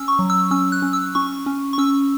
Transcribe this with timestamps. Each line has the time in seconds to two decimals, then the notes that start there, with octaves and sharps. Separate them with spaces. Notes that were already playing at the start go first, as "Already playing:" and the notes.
Already playing: C#4 E6
0.08 C#6
0.19 F#3
0.30 E6
0.51 C#4 E6
0.72 F#6
0.82 C#4
0.93 E6
1.15 C#4 C#6
1.46 C#4
1.73 C#6
1.78 C#4 E6